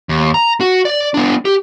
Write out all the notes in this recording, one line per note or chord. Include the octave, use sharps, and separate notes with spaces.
D#2
A#5
F#4
D5
B3 D4
G4